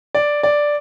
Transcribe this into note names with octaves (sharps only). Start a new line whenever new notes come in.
D5
D5